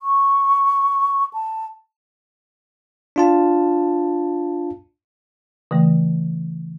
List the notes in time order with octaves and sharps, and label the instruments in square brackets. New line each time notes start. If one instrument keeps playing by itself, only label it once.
[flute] C#6
A5
[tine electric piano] D4 F4 A5
[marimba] C#3 E3 A3